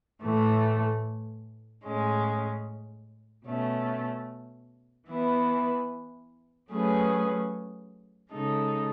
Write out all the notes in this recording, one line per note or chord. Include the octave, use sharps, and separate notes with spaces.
A2 E3 A3
A2 G#3 C#4
B2 A3 C#4
E3 B3 E4 B4
F#3 A3 C#4 G#4 B4
C#3 G#3 D#4 A4